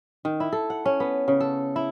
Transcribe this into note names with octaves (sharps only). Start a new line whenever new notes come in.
D#3
E4
A4
F#5
C#4
B3
C#3
A4
E4